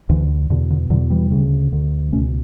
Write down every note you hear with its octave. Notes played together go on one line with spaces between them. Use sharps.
D2 D3 E3
E2 B2 D3
D3
E2 B2 D3 F#3
E3 G3
D2 C#3
D2 D3
C#2 B2 A3 C#4